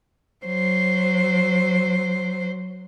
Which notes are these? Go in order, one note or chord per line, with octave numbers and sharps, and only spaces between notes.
F#3 C5